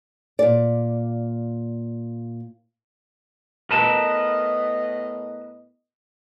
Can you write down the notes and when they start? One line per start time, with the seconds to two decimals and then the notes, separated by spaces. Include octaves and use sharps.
0.39 A#2 D5
3.71 A2 B3 A#4 B4 D#5 A5